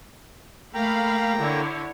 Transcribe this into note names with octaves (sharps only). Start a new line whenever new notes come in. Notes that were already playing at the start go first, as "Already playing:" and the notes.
A3 A#3 F5 G5 A#5 B5
D3 E4 C#5